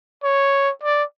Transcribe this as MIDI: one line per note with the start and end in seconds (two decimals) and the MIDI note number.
0.23 0.71 73
0.83 1.04 74